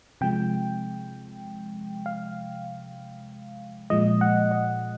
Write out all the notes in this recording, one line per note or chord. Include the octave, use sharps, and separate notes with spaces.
C3 F3 G#3 G5
F5
A#2 F3 G#3 D#5
F#5
D#5